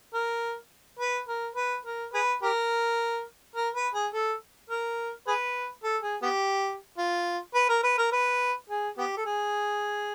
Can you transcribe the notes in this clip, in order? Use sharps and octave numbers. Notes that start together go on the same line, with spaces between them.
A#4
B4
A#4
B4
A#4
G#4 B4
G4 A#4
A#4
B4
G#4
A4
A#4
G#4 B4
A4
G#4
B3 G4
F4
B4
A#4
B4
A#4
B4
G#4
B3 G4
A4
G#4